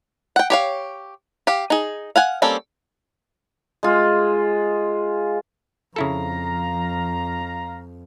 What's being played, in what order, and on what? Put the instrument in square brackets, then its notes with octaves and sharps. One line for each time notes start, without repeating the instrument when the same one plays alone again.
[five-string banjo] F#5 G5
G4 C#5 F5
G4 F5
D#4 G#4
F5 F#5 G#5
G3 A#3 C4 C#4 A4
[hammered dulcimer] G#3 F4
[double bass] F2 [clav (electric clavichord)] C#3 E4 A4 [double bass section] F3 [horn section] F5 A#5